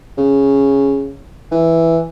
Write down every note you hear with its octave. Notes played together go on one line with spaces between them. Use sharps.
C#3
E3